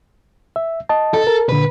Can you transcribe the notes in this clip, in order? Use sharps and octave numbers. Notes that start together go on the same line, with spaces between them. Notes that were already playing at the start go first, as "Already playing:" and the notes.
E5
D#5 A5
A4
A#4
A#2 D3 B4